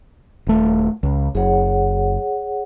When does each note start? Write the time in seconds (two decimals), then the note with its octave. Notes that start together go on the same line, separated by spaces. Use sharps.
0.47 D#1 A3
1.03 C#2
1.35 F#1 G#4 C#5 F#5